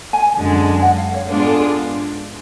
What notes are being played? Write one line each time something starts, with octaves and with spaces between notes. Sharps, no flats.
G#5
F#2 D3 G#3 D4
G#5
F#5
F5
C#5
G#2 G#3 B3 D4 F4 B4
A4
G#4